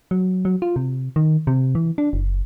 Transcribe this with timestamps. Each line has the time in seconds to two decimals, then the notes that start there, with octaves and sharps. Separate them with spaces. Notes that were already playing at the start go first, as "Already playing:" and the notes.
0.11 F#3
0.45 F#3
0.62 F4
0.76 C3
1.16 D#3
1.47 C3
1.75 E3
1.98 D4
2.13 F#1